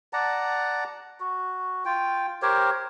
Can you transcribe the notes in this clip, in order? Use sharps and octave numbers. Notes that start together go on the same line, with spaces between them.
D5 F#5 A5 A#5
F#4
F4 G5
G4 A#4 C5 C#5